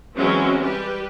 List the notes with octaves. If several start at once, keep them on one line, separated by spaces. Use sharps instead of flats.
E3 F#3 G#3 C4 C#4
G3 G4 B4